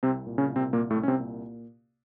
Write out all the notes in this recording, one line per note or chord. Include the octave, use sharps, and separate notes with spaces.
C2 C3 C4
A#2
C#3 C#4
C2
C3 C4
A#2 A#3
A2 A3
C2
C#4
C3 C4
A#2